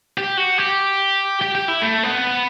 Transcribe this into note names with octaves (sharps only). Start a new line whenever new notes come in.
G4
F#4
G4
G4
G4
E4
A3
B3